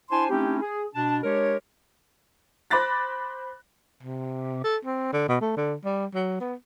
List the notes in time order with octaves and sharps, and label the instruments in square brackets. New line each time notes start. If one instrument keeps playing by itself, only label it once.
[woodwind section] D4 E4 C5 G#5 A5 C6
A3 C4 C#4 D#4 E4 G4
G#4
B2 D4 A5
G#3 D4 G4 A#4 C#5
[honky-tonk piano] C5 B5 D6 F#6 A6 A#6
[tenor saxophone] C3
A4
C4
D3
B2
A3
D3
G3
F#3
B3